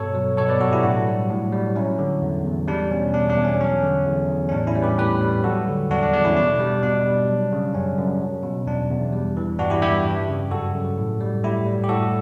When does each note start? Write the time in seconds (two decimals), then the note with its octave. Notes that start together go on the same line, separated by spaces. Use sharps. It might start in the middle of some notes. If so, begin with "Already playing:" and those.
Already playing: G2 B2 A4 C#5
0.14 F#3
0.37 B2 A4 C#5
0.49 B4 D5
0.60 F#3 F#4 A4
0.72 E4 G4
0.83 A2 D4 F#4
1.07 G3
1.30 A2
1.52 G3
1.76 F#3 C#4 E4
1.99 D3
2.22 E2
2.45 E2
2.68 G3 D4
2.91 B2 C#4
3.14 E2 D4
3.29 D4
3.37 E2
3.44 C#4
3.61 F#3 C#4
3.83 D3
4.06 E2
4.29 E2
4.49 C#4
4.52 A2 D4
4.67 C#4 E4
4.75 G3
4.82 G4 B4
4.98 A2 G4 B4
5.21 G3
5.44 F#3 F#4 A4
5.68 D3
5.91 E2 D4 F#4
6.03 D4
6.13 E2 D4
6.25 C#4 E4
6.36 B2 D4
6.60 G3
6.83 B2 D4
7.06 G3
7.28 F#3
7.52 C#3
7.74 F#2 C#4
7.98 F#2
8.21 F#3
8.43 B2
8.66 E2 D4
8.90 E2
9.13 G3
9.37 E3
9.59 G2 D4 F#4
9.70 E4 G4
9.82 G2 E4 G4
10.05 G3
10.28 C#3
10.51 F#2 F#4 A4
10.75 F#2
10.98 A2
11.20 G3
11.44 A2 E4 G4
11.66 G3
11.84 G4
11.89 A2 F#4 A4